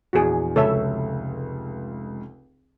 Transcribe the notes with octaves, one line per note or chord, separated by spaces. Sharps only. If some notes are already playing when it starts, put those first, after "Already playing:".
A#1 E2 F#4 G#4
F1 C#2 A4 C#5 E5